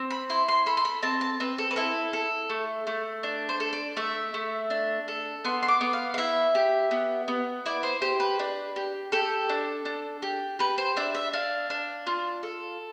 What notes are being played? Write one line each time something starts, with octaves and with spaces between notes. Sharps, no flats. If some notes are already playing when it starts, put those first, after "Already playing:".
Already playing: C4
B5
E4 C6
C6
A4 B5
C6
B5
C4 A5
A5
C4 B4
A4
B4
E4 A4
A4
A3
A3
D4
C5
A4
D5
A3 E5
A3
D4
A4
B3 C6
C6
D6
B3
F5
F5
E4 E5
G4
B3
B3
E4 D5
C5
G4 C5
B4
D4
G4
G4 A4
D4
D4
G4
G4 B4
C5
D4 E5
E5
D4 F5
D4
F4
A4